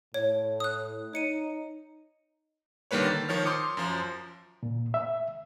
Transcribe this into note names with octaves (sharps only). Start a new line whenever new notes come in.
A2 C#5
D#6 F#6
D#4 C#5 C#7 D#7
D3 D#3 G3 A#3 B4 C#5
A6
D#3 F3 C#5 F6
C6 D6 D#6 C#7
F#2 F3
A#2
E5